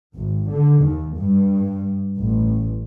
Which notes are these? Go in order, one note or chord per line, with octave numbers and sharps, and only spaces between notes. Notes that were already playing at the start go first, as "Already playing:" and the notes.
G#1
D3
D#2
G2
A1